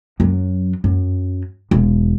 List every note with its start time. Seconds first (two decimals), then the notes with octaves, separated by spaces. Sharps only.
0.20 F#2 F#3
0.84 F#2
1.71 E1